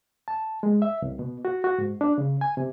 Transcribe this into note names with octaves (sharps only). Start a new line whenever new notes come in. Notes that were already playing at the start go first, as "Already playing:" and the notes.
A5
G#3
E5
C2
B2
F#4
F#4
G#2
D4
C#3
G#5
C3